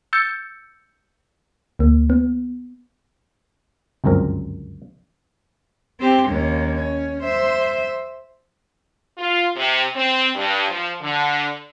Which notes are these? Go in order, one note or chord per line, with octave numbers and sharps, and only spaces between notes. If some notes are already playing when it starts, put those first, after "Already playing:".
E6 G6 A6 C#7
D2 A#3
B3
G1 C#2 F#2 C4 A#4
C4 G4
D#2 C#4
C#4
C5 E5
F4
C3
C4
G2
F3
D3